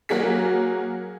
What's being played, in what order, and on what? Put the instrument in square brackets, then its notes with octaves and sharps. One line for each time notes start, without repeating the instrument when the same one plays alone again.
[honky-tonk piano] F#3 A#3 F#4 G#4 B6